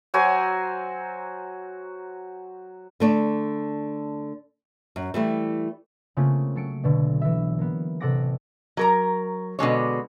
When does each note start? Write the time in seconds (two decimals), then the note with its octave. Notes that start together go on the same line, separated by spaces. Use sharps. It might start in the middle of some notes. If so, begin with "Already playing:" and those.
0.14 F#3 F#4 C5 G#5
3.00 D3 A3 D5
4.96 F#2
5.14 E3 G3 A3
6.17 C#3 A3 A#3 C4 C#4 F4
6.55 F#3 A4 C#7 D7
6.83 B1 B2 D3
7.21 E3 E5
7.58 A#3 B3
8.00 A1 C3 A4 F#5 D6 A#6
8.77 F#3 A#4 A#5
9.59 B2 D3 G#3 C#5